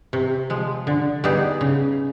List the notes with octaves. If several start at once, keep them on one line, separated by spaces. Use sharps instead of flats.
C3
F3 G#3
D3
G3 B3 D#4 G#4
C#3